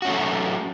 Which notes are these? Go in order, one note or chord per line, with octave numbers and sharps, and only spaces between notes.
F#3 A3 C#4 F#4